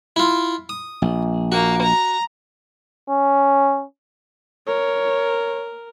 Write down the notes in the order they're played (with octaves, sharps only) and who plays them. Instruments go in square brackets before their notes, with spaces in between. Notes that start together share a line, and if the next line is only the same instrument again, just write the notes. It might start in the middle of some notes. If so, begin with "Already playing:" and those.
[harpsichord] E4 F4
D#6
[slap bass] A#1
[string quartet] A#3 [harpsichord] F#4
[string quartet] A#5
[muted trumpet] C#4
[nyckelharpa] A#4 [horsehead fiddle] C#5